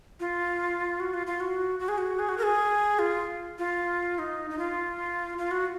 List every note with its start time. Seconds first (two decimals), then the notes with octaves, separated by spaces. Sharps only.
0.20 F4
1.00 F#4
1.14 F4
1.27 F4
1.40 F#4
1.80 F#4
1.88 G#4
1.98 F#4
2.19 G#4
2.29 F#4
2.38 A#4
2.43 G#4
2.99 F4
3.59 F4
4.19 D#4
4.50 D#4
4.58 F4
5.38 F4
5.51 F#4